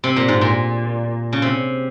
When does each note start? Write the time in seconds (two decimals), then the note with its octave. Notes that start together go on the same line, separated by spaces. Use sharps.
0.04 C3
0.16 A#2
0.28 G#2
0.41 A#2
1.33 C#3
1.42 C3